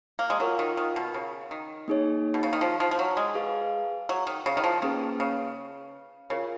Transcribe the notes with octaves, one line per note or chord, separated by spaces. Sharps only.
A#3
G#3
F#3 F4 A#4 F5
D#3
D#3
B2
C#3
D#3
A#3 D#4 G#4 C#5
B2
C#3
D#3
F3
F3
F3
F#3
G#3
G#4 B4 F5
F#3
D#3
C#3
D#3
F3
D#3 A#3 C#4 G#4 B4
C#3
C#3 F4 A#4 C#5